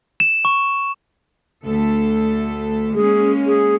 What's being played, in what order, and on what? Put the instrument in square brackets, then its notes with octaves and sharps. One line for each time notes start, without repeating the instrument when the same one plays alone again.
[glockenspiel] E7
C#6
[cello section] D2 A3 A4
[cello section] G#3 A#3 C#4 [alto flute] G#4
[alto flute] G#4